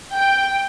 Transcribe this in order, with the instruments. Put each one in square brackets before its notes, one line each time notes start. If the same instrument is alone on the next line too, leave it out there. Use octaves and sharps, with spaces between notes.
[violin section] G5